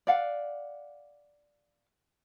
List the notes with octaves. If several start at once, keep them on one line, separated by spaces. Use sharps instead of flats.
D5 F5 F#5